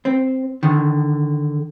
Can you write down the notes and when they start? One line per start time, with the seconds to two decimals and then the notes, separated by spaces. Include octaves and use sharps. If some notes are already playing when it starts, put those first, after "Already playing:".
0.05 C4
0.63 D3 D#3